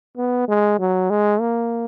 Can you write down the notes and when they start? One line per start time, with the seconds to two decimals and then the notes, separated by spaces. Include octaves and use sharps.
0.17 B3
0.48 G#3
0.79 F#3
1.10 G#3
1.40 A#3